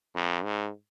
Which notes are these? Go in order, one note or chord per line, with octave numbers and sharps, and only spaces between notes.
F2
G#2